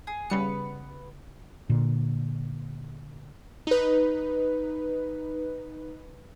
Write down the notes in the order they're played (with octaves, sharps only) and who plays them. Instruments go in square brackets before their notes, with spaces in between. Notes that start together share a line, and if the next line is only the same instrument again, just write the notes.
[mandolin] G#4
[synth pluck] C#3 G3 C#7 [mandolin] B3 B4
[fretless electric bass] A#2 D3
[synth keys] D#4 B4